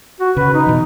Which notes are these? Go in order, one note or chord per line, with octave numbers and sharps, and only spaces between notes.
F#4
C#3 B4
D#4
B2 E3